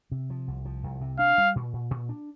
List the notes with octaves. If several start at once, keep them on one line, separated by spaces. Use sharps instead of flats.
C3
F3
C2
F3
C2
C3
D4 F5
G3
A#2
A#2
A#2
D4